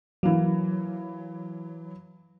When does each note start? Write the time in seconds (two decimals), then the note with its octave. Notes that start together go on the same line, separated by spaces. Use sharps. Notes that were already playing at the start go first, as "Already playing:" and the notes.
0.23 E3 F#3 A#3